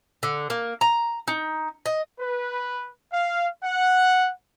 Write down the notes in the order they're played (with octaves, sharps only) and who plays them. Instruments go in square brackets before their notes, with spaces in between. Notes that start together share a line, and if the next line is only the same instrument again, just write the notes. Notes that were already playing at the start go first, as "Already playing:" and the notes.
[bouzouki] D3
A#3
A#5
D#4
D#5
[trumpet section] B4
F5
F#5